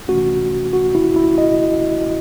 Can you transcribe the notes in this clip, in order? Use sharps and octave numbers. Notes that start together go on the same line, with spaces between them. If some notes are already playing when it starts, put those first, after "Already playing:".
C3 E3 A3 C#4 F#4
F#4
E4
E4
D#5